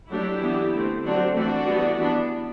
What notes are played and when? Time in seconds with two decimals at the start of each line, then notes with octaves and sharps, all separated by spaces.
0.09 F#3 A3 D4 E4 G4
0.41 E3 B3 D4
0.73 D3 A3 C4
1.04 D3 F#3 C4 D4 F#4
1.35 E3 A3 C4 D4 F#4
1.67 E3 G3 B3
1.99 E3 B3 D4